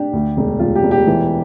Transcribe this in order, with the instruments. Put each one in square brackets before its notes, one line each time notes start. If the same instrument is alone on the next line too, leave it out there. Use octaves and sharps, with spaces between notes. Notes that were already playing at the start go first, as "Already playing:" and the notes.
Already playing: [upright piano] D4 G4
D2
E1
E1 F4
G4
E1
G4
E3